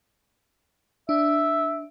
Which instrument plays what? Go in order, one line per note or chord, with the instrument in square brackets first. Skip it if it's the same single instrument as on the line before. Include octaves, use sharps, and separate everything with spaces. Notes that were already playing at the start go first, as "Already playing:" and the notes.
[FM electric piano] D4 [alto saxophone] E5